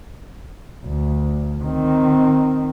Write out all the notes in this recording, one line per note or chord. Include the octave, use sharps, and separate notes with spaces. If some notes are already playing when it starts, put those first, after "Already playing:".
D2
D#3 C4